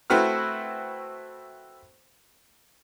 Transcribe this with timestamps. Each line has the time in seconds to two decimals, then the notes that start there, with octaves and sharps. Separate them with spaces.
0.10 A3 C4 E4 F#4 B4 F6